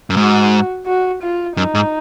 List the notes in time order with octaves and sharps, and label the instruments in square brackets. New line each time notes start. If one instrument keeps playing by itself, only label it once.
[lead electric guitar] F#2
[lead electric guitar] G#2 [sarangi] F#4
[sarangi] F#4
F4
[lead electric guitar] F#2 [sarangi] D#4
[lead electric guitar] G#2